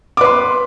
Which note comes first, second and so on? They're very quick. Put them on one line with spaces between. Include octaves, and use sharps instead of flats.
D6 B4 C6